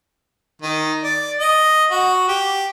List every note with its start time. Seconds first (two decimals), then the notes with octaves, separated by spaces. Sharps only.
0.62 D#3
1.04 D5
1.40 D#5
1.91 F#4
2.29 G4